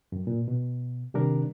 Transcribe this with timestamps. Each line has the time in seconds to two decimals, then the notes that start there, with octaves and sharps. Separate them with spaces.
0.12 F#2
0.27 A#2
0.48 B2
1.14 C3 D#3 G3 D4 A#4